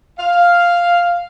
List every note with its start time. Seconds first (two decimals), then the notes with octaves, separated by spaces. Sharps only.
0.20 F5